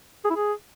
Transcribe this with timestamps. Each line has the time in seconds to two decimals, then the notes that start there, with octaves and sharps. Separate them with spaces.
0.25 G#4
0.30 E4
0.36 G#4